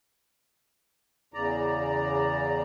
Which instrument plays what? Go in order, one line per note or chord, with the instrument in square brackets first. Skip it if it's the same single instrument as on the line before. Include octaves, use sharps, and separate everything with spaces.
[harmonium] E2 C#3 D5 A#5